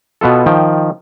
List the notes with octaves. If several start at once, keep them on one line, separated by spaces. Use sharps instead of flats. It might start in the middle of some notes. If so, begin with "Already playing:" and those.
B2 B3 F4 A4
D#3 F3 G5